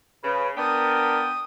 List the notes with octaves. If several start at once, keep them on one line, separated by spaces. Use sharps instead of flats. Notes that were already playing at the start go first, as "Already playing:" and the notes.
C#3 B4
B3 D4 A#4 G5 D#6